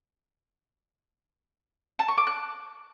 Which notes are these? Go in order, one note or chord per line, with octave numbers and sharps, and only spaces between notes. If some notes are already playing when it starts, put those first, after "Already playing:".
A5
C#6
D6
F#6